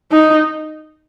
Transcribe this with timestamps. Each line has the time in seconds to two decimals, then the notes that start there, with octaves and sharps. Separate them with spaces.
0.12 D#4